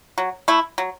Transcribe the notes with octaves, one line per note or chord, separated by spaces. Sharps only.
F#3
A3 E4
F#3